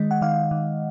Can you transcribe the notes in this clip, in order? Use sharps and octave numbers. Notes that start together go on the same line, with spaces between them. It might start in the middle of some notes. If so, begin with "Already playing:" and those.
Already playing: D#3 G#3 D#5
F#5
D#3 F5
D#3